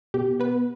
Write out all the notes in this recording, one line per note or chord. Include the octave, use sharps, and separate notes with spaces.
B2 G4
B3 B4